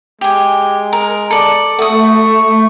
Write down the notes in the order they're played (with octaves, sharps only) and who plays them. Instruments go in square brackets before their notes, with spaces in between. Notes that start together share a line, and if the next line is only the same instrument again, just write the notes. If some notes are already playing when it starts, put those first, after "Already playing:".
[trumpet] G#3 [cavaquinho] G4 G#5
[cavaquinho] A#4
A4 D5
[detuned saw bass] A3 [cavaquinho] F#4 D#6 [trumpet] C#6